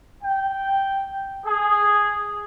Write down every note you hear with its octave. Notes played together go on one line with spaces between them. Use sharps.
G5
G#4